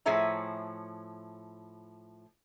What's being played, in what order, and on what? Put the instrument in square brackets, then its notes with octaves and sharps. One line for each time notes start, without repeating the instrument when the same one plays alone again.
[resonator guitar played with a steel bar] A2 F3 G#4 C#5 E5 A#5